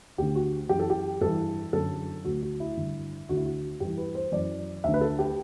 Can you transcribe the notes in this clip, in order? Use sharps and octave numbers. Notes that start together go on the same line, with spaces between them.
D2 D3 G4
F#4
F#2 E3 G4
A4
G4
G2 E3 A4
F#2 D3 A4
D2 D3 F#4
F#4
E4
G2 D3
D2 D3 F#4
E4
F#4
G2 E3 G4
B4
C5
F#2 E3 D5
D2 D3 E5
B4
A4
G4